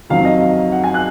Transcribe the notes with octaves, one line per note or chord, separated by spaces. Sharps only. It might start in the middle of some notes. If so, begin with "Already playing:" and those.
F2 D#3 F#3 F5
D#5
F5
F#5
G#5
F#6